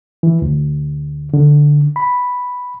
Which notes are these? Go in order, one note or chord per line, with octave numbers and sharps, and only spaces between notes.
E3
D2
D3
B5